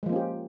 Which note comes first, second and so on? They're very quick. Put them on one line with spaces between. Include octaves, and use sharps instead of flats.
G#3 F3 A#3 C#4 G4